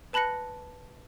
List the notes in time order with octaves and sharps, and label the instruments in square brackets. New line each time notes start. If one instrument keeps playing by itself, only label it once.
[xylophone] B4 A5 B5 F#6 A#6 C#7